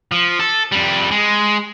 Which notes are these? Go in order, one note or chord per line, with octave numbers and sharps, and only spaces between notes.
F3
A4
F2 G3
G#3